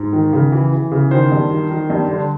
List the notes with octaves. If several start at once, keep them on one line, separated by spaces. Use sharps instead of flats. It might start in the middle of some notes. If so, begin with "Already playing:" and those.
Already playing: G#2
D#3
C#3
E3
E3
C#3
D#3 C5
G2
D#3
D#3
G2
D3